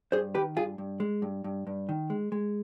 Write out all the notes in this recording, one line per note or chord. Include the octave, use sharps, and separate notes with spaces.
G2 G#4 C5
D#3 G4 B4
G2 F4 G#4
G2
G#3
G2
G2
G2
D#3
G#3
G#3